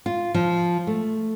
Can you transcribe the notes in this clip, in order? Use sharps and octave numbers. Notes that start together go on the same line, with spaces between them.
F4
F3
A3